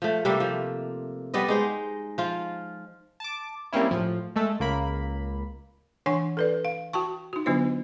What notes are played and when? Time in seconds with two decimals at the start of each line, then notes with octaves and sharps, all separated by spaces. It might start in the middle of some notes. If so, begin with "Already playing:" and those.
0.02 F3 A3
0.25 C3 G3 A3 A#3
0.40 F3
1.34 G3 B3 D5 D#5
1.48 G#3 D#4 C5
2.18 F3 F4
3.20 A5 D6
3.73 G3 A#3 C4 C#4 E4
3.91 A2 F3
4.36 G#3 A3 A4
4.60 C#2 A#3 B5
6.06 E3 D4 C#5 F#5 G#5 C#6
6.37 A4 B4 D5
6.65 F5
6.93 F#4 G5 A5 C#6
7.33 D#4 F#4
7.46 D3 F#3 B3 D4 F4 C5